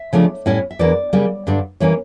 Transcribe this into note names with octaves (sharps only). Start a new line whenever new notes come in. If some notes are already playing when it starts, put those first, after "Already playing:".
Already playing: E5
C#3 F3 A3 D4
A2 G3 C#4 E4
E5
E2 E3 A#3 D4 D5
C#3 G3 A#3
G2 D3 G3 D4
E3 G3 A#3 C#4 C#5